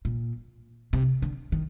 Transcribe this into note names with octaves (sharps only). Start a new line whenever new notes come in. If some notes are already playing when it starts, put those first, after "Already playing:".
A#2
C3
D3
D#3